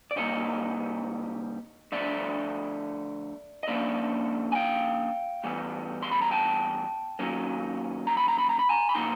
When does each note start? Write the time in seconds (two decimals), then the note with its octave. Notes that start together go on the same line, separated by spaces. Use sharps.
0.11 D5
0.16 C3 D#3 G3 A#3 C#5 D#5
1.92 D3 F3 A3 D5 E5
3.63 D#5
3.68 D3 F3 A#3 C#4 D5 E5
4.52 G#5
4.55 F5 G5
5.44 A2 E3 G3 B3
6.03 C6
6.11 B5
6.21 A#5
6.31 G5 A5
7.19 D#3 F#3 A#3 C#4
8.07 A#5
8.17 B5
8.28 A#5
8.38 B5
8.49 A#5
8.59 B5
8.69 G#5 A#5
8.89 B5
8.94 C3 F3 A#3 D#4 A#5 C6